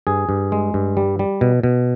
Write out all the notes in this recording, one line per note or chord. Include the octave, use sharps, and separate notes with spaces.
G2 G#4
G2
G#3
G2
G3
G3
B2
B2